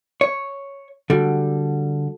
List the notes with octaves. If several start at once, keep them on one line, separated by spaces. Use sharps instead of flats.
C#5
D3 G3 F#4 A4